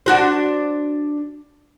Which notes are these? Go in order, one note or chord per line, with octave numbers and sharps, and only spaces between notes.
D4 F#4 C5